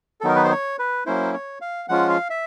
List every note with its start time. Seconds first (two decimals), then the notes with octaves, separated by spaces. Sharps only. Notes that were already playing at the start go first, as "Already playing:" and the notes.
0.21 A4
0.24 D#3 F#3 B3 D#4 A#4
0.36 B4
0.44 C5
0.52 C#5
0.79 B4
1.06 F#3 A#3 C#4 E4 C5
1.34 C#5
1.61 F5
1.89 F3 G#3 C#4 F4 F#5
2.09 F5
2.30 E5